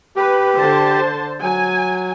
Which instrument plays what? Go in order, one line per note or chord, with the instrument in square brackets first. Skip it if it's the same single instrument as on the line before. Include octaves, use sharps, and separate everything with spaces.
[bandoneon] G4 [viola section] B4
[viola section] D3 C5 A5
[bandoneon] F#3 [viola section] G#5